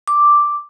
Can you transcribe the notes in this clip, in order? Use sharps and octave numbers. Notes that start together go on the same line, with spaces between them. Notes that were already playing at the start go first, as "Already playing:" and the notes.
D6